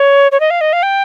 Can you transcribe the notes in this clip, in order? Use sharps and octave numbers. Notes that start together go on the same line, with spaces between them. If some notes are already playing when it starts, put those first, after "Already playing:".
Already playing: C#5
C#5
D#5
F5
D#5
F5
G5